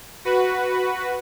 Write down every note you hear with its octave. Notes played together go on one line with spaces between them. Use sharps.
F#4 B4